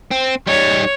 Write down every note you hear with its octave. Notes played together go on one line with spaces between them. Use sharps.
C4
G3 D#4 C#5